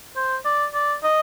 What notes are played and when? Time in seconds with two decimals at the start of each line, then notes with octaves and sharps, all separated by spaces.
0.16 C5
0.45 D5
0.74 D5
1.04 D#5